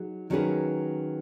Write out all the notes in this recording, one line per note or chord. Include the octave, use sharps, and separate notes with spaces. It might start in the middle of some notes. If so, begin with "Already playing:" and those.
Already playing: F#3 D#4 G#4
D#3 F#3 C#4 G#4 B4